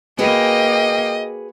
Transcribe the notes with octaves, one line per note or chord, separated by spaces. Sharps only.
A#3 F#4 G#4 B4 D#5 G5